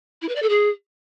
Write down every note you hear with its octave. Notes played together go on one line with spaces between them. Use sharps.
E4
B4
D5
A4
G#4